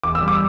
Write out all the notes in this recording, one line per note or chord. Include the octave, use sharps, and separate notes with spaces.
E1 D6
E6
G3
D6